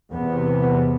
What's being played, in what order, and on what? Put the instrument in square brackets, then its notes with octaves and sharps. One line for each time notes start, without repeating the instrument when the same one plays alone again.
[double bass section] E2 C3 B3